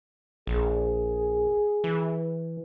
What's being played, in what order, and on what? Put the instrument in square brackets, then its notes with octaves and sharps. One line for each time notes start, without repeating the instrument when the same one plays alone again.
[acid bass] A#1 [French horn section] G#4
[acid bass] E3